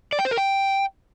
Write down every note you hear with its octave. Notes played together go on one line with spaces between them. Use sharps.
D5
G5
C5
A#4
G5